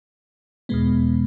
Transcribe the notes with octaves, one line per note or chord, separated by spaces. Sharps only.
E2 B2 G#3 B3